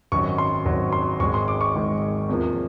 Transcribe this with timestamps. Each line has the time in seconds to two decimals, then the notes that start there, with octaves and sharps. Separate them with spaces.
0.12 G#1 F#2 D#3 F#3 C#6
0.38 C6
0.66 G#1 F#2 D#3 F#3
0.93 C6
1.20 G#1 G#2 D#3 G#3 C#6
1.34 C6
1.48 D6
1.61 C#6
1.74 G#1 G#2 D#3 G#3
2.29 E2 C3 F3 A#3